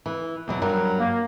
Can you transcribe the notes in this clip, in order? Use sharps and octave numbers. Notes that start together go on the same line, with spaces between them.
E3
E2 B2 F#3
G2 F#3 A#4
A#3